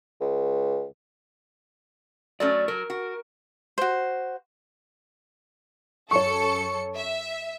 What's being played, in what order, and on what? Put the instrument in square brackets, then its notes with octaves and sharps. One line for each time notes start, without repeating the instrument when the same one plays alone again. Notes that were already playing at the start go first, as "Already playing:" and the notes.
[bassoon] C#2
[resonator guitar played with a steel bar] F#3 A3 C#4 [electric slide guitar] D5
[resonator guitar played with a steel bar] F#3 [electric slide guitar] A#4
[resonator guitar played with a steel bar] F#4
[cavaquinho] F#4 C5
[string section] F#2 A4 C#7 [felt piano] C#5 C#6
[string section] E5